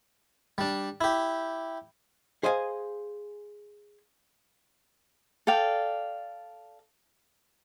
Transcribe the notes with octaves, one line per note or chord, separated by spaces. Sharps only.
G3 D4
E4 G4
G#4 C5 D#5 F5 G#5
A4 D5 F5 G5